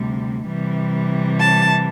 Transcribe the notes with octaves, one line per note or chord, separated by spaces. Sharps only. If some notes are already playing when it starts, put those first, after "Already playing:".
Already playing: D2 C3 G3
C3 E3 G3
A5